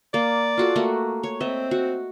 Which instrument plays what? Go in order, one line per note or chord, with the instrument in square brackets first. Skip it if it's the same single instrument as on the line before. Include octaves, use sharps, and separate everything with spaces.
[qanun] A#3 [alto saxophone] D5
[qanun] F4 F#4 A4
A3 A#3 F#4
C#5
[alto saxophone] C4 [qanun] D#5 E5
[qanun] F#4